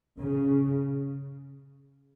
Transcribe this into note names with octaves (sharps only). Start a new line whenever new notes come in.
C#3